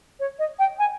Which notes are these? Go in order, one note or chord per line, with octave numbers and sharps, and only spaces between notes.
C#5
D#5
G5
G#5